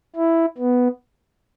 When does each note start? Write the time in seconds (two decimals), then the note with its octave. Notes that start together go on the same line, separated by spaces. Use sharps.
0.16 E4
0.58 B3